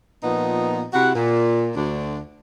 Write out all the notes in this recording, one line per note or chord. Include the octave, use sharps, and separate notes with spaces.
A#2 F3 B3 D#4
C3 E4 F#4 F#5
A#2
D2 D4